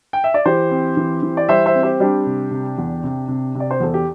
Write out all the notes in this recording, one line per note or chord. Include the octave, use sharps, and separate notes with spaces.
G5
E5
D5
E3 G4 C5
C4
E3
E3
D5
G3 C5 E5
C5 E5
C4
G4 C5
G3 D4 G4
C3
C3
E2
C3
C3
C3
D5
C5
E2 A4
G4